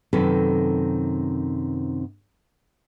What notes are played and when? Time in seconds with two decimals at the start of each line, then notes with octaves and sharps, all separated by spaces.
0.13 F#2 C3 D#3 C4 A4 B4